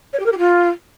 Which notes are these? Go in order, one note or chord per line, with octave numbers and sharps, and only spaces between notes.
C#5
G4
A#4
G4
F4